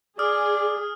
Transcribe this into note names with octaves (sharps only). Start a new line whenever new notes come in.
G#4 D5 D#6 F6